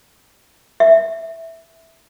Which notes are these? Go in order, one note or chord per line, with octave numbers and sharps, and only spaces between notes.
E5